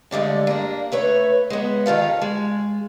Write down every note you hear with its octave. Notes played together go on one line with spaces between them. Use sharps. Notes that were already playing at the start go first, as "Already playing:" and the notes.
G2 D3 G#3 A3
A#3 D4
A3 B4 C#5
G#3 B3
D#3 F4 A4 F5
G#3